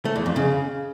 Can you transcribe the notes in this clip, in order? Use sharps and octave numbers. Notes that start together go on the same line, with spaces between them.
A3
E2
F2
C#3